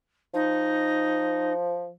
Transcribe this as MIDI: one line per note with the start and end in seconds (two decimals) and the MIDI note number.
0.34 1.91 53
0.34 1.53 63